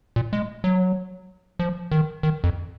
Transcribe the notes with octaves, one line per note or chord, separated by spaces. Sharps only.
A#2
G#3
F#3
F3
D#3
D#3
F2